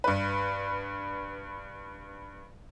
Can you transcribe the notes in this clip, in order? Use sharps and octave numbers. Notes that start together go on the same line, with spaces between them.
G2 B4